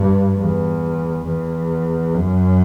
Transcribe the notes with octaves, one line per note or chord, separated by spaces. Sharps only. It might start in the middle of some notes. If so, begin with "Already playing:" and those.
Already playing: G2
E2
E2
F#2